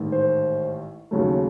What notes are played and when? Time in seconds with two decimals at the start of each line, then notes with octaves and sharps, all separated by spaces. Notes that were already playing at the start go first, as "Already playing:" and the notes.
Already playing: A1 G#2 D#3
0.12 C5
1.11 D#2 C#3 F#3 A3